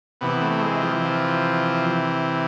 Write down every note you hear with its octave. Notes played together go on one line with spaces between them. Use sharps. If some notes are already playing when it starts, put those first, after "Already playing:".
C3 E3 B3
A3
A3
G#3
F3
F3